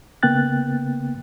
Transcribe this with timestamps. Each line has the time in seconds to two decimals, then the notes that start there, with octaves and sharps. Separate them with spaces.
0.23 C#3 A#3 B3 G5 F#6 A6